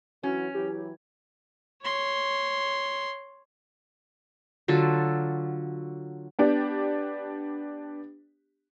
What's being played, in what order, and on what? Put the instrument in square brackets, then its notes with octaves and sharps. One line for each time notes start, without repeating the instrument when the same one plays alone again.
[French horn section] E3 F#3 F#4 [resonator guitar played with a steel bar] C#4
[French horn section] E3 F#3 E4 [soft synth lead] G4
[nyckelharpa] C#5 C6
[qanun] D3 F#3 F4 A4
[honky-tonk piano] B3 D4 G4